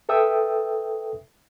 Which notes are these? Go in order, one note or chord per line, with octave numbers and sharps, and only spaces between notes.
A4 B4 E5 G5 D#6 E6